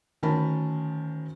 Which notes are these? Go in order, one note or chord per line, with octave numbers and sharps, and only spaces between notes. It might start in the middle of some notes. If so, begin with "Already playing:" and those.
D2 D#3 C#4 A#4 A5 B5